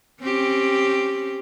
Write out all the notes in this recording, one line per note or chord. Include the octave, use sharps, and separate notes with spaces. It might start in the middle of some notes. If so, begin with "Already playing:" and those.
C4 C#4 G4